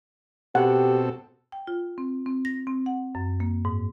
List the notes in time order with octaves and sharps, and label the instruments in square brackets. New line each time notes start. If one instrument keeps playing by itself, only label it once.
[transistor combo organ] B2 C4 A4 [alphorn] G4 [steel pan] F#5
[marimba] G5
F4
C4
C4
A#6
C4
F#5
F#2
A#3
G#2